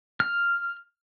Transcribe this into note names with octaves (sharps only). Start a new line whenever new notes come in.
F6